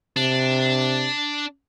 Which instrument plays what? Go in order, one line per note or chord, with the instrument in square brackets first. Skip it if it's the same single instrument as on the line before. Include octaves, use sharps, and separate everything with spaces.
[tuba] C3 [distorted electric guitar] D4